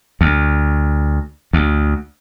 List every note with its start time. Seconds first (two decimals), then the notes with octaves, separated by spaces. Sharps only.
0.21 D2
1.53 D2